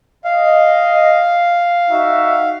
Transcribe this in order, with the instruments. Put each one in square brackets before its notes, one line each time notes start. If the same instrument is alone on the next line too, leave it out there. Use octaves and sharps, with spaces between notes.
[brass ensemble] D#5 [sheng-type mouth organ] F5
[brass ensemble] D#4 F#4 E5